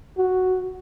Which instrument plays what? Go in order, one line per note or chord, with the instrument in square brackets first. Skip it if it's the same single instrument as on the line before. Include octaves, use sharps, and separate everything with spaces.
[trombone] F#4